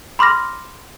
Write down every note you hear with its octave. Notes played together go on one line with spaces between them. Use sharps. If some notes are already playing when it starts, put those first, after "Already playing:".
B5 C6 D6 F6 A#6